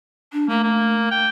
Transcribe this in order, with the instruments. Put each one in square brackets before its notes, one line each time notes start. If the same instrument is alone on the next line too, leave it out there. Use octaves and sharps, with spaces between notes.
[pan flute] D4
[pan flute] A3 [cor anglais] A#3
[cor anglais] A#3
G5